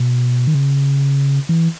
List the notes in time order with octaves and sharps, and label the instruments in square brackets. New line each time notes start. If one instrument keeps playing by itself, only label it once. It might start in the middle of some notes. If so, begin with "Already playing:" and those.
Already playing: [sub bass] B2
D#3
C#3
E3